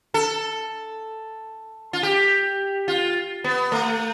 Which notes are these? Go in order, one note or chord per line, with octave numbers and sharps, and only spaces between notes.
A4
F4
G4
F4
B3
A3